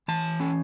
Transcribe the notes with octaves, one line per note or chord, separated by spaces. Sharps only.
E3 A5
C#4